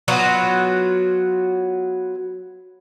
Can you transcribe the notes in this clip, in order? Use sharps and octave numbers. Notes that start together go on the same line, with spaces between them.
F#3 B3 F4 F#4